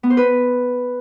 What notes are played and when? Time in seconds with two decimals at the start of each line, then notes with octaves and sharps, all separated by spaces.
0.03 B3
0.10 C5
0.17 B4